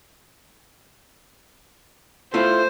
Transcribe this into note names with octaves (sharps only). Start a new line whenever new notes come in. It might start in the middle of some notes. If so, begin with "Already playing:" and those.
A3 E4 F4 C5